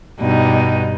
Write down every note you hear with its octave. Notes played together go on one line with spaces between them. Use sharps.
G2 B2 D#4